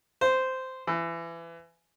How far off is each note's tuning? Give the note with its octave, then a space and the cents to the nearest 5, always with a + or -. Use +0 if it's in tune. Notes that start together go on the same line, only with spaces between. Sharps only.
C5 -10
E3 +25